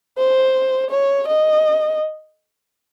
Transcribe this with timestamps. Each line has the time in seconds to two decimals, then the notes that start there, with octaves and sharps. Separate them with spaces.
0.18 C5
0.90 C#5
1.28 D#5